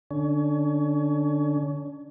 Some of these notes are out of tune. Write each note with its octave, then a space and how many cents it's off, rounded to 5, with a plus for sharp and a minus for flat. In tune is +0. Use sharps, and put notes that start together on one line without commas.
D3 +15 C#4 +35